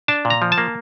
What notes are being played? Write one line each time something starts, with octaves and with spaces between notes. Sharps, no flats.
D4 A5
A#2
A#5
F3
A5
A#3